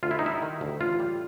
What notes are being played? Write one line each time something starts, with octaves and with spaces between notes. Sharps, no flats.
D2 F4
E4
D#4
G3 E4
D#3
D2
A1 F4
G3